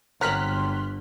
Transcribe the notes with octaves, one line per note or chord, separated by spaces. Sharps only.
G1 D3 F#3 C4 C6 F6 F#6 B6